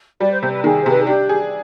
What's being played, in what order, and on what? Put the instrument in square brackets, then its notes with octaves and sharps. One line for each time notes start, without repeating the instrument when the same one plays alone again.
[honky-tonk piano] G3 [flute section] B4 D5
[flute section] C5
[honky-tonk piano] C3 [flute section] C5
[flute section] B4
[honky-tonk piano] D#3 [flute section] G#4
[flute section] C5
[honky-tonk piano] C3 [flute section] B4
[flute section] G#4
[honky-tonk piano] D4 [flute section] G4
[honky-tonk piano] G#4